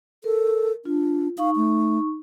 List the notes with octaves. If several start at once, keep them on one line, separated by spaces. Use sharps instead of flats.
A4 A#4
D4 F4
D#4 F5 C#6
A3